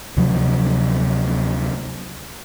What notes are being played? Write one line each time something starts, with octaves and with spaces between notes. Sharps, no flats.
D2 C3 F3 F#3